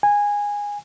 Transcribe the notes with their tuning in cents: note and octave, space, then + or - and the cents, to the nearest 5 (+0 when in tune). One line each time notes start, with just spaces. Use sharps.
G#5 -15